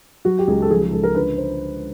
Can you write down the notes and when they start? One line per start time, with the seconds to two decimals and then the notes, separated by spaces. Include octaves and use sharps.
0.25 F#3 F#4
0.39 G4
0.48 C#2 G#4
0.62 A4
0.70 F3 G#4
0.81 G#4
0.92 C#2 A4
1.03 A#4
1.15 D3 B4
1.38 C5